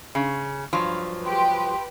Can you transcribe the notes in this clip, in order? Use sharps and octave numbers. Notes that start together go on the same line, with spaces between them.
C#3
G2 F3 F#3
G4 B4 G5 C6